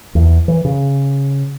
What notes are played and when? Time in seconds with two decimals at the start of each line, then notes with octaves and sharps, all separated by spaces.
0.15 E2
0.48 E3
0.65 C#3